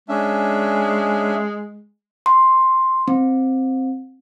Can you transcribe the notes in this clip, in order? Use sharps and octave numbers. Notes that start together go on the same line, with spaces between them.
G#3 C#4 D4 E5
C6
C4